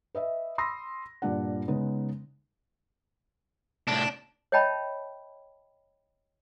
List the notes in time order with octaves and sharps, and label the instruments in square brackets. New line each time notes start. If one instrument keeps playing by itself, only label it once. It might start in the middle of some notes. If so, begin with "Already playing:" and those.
[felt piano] B4 D#5 E5
B5 C6 D#6 E6 A#6
G2 A#2 D4 F#5
C#3 G#3 B3 D#4
[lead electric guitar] C2 A2 [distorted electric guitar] D4
[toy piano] C#5 D#5 E5 G5 A5 B5